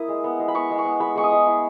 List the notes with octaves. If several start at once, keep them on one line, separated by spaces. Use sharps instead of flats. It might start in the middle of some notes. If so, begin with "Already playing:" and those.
Already playing: A#3 E4 D#6
G#3
B3
G#3
B5
B3 C#6
G#3
C#6
B3
G#3 B5
G#3 C#6
D#6
G#3
E4